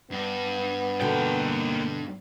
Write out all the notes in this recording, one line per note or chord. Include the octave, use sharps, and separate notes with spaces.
G2 B3
B2 D3 A#3 G5